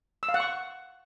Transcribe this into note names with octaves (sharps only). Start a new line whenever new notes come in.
E6
F5
F#5
C#6